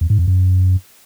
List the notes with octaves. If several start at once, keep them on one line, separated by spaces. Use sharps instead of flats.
E2
G#2
F2
F#2